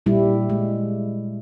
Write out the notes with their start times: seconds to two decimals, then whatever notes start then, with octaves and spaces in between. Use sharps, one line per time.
0.06 A#2 G3 E4
0.50 G#3